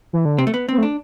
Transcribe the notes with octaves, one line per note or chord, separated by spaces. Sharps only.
E3
D3
C3 C4
A3
B3
B3 C4
A3
D4